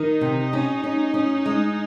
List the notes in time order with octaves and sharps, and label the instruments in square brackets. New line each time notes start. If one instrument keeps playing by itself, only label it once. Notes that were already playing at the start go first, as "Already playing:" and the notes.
Already playing: [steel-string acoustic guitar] D#3 [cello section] D#4
[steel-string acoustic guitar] C3
C#4
C#4
C#4
G#3